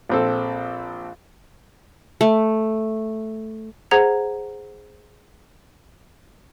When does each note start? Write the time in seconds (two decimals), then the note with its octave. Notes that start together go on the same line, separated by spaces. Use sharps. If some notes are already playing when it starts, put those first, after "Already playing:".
0.09 A#1 C4 A4
2.21 A3
3.91 G#4 C5 F#5 A#5 G#6 F7